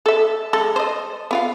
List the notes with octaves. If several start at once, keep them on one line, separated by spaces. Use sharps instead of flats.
A4 E5
G#3 A4
C5 D#5
B3 F4 F5